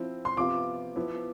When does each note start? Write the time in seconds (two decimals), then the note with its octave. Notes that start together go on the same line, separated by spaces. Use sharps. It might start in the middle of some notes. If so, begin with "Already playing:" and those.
Already playing: F3 C4 E4
0.25 C6
0.37 C3 F3 B3 F4 D6
0.96 F3 B3 E4